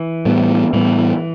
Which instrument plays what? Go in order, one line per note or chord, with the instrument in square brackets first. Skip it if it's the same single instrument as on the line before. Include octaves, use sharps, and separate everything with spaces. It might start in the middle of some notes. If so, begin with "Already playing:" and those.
Already playing: [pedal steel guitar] E3
[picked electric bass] A2 G3 B3
[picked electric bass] A2 G3 B3 [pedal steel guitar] E3